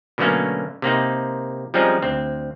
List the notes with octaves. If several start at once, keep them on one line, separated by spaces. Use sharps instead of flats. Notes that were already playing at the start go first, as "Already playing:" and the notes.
B2 D3 F#3 A3 A#3 C#4
C3 A#3 C4 D#4
F3 G3 G#3 C4 C#4 D#4
D2 C4